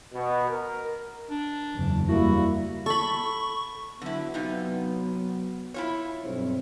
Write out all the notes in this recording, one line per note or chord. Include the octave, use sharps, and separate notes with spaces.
B2
A#4
D4
F#1 E2
G3 A#3 E4 F#4
A4 B5 C#6
D3 F#3 B3 E4
C3 D#4 F4
E4 F4 C#5
B1 G2 C4